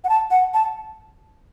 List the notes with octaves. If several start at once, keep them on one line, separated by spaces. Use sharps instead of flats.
F#5
A5
F#5
A5